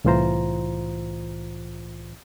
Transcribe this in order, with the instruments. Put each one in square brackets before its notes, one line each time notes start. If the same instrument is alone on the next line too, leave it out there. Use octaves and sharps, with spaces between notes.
[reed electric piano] C2 A2 E3 F4 C5 A#5